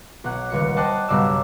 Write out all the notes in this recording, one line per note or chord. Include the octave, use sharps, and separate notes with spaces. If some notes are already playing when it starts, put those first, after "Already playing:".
B1 F#5
D#1 C#2 C#7
C5 D5 D#5 F#5 G5 A5
B1 G2 C#3 D5 E6